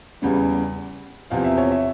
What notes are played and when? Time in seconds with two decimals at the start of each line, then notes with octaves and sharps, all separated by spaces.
0.22 E2 C#3 G3 C#4
1.30 E2 C3 F3 C4 F5
1.44 E5
1.58 C#5
1.71 E5